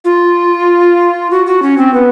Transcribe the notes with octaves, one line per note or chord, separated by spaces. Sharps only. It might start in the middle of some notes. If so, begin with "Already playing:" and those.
F4
F#4
F#4
C#4
C4
B3